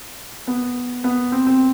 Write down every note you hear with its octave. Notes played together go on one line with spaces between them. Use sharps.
B3
B3
C4
C4